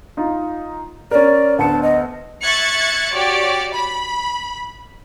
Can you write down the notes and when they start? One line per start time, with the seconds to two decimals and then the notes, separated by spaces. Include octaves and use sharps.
0.17 D#4 F4
1.11 C#4 A#4 D5
1.59 D2 B3 A5 C#7
1.83 D#5
2.44 E5 C#6 F#6 G#6 A6 C#7
3.13 F#4 G4 C#5 D5
3.75 B5